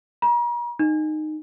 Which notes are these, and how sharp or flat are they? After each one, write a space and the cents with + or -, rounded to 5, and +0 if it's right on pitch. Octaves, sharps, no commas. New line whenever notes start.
A#5 +40
D#4 -15